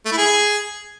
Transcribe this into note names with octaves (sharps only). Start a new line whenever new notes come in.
A3
E4
G#4